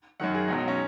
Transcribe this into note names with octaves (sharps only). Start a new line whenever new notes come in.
F#2 D#3 F#3 F#5
G#4
C#2 B2 F#3 D#4
D#4
C#4